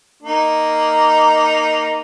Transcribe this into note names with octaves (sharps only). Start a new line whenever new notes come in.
A#3 D#4